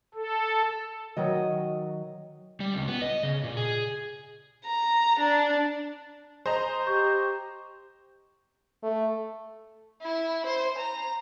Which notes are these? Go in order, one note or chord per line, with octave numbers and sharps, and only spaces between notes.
A4
D#3 F#3 D#5
G3
C#2
B3
D#5
C#3
A#2
G#4
A#5
D4
C5 D#5 A#5
G4 C#6 G6
A3
E4
C5
A#5